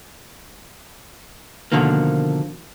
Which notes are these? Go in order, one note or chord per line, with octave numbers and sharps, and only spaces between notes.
B2 D3 D#3 F3 A#3